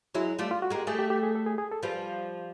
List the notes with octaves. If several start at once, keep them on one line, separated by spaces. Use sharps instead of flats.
F#3 G#3 E4
G3 A3 F4
F4
F#4
G#3 A#3 G4
G3 A3 G#4
G4
G4
G#4
A4
G#4
G#4
A4
F3 G3 B4